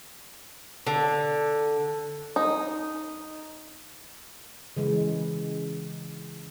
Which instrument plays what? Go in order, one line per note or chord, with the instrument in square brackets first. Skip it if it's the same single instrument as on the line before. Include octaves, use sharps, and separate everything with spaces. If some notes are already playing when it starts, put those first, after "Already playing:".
[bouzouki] D3
[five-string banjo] D#4
[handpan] C#3 E3 G#3